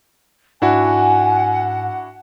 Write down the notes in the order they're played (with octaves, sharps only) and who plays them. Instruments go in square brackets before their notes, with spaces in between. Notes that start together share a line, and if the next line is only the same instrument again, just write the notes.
[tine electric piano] G#2 [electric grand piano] D4 E4 F#4 [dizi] F#5 [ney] G#5